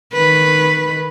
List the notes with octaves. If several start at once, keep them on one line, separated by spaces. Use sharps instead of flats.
D#3 B4